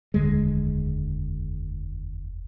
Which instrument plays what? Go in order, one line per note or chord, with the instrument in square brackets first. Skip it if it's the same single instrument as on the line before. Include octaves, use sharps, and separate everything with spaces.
[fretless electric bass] F1 D#2 D3 G#3